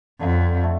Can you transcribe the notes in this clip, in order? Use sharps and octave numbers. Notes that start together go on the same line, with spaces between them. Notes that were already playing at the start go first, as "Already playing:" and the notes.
F2 D3
A3